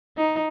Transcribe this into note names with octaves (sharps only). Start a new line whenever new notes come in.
D#4